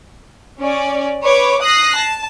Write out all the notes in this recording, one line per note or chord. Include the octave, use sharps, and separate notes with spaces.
C#4 D5
B4 C#5 D6
D#6 F#6 A#6 C7
A5